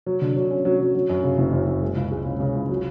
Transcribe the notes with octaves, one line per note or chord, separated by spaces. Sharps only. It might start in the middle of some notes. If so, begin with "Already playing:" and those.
F#3
D3
F#3
C#4
F#3
F#3
F#3
F#2
C#3
F#1
F#2
F#2
G#3
C#2
G#3
C#3
C#3
C#2
F#3